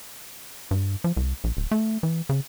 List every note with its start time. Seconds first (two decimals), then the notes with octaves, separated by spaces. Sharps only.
0.71 G2
1.04 F3
1.17 C2
1.44 A#1
1.57 D1
1.71 A3
2.03 E3
2.29 C#3